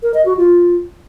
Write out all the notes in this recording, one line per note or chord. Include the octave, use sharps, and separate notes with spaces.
A#4
D#5
F#4
F4